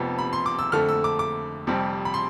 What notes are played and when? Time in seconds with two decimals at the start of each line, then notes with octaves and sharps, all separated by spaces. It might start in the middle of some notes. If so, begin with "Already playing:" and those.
Already playing: F1 F2 C3 F3 B3
0.19 B5
0.33 C6
0.46 D6
0.59 E6
0.72 F2 D3 A3 F6
0.89 E6
1.04 D6
1.19 D6
1.67 F1 F2 C3 G3 C4
2.05 B5
2.14 C6